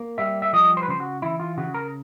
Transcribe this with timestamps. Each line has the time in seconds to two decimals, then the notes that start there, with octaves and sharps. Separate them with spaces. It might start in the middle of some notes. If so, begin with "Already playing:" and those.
Already playing: A#3
0.18 G3 E5
0.42 E5
0.53 F3 D#5
0.77 C5
0.83 B4
0.88 C#3 C5
1.00 F#4
1.22 E3 E4
1.40 F4
1.57 C#3 F#4
1.74 A#4